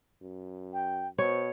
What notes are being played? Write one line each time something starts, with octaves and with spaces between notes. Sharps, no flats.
F#2
G5
B2 C5 C#5